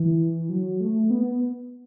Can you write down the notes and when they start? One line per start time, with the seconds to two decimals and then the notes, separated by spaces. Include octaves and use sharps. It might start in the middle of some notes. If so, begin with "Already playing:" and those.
Already playing: E3
0.49 F#3
0.81 A3
1.10 B3